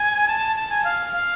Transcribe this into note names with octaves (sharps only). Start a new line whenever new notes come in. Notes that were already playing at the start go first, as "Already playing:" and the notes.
Already playing: G#5
A5
A5
G#5
F5
F5